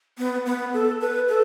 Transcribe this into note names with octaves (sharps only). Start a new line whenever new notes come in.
B3
B3
A4
B4
A4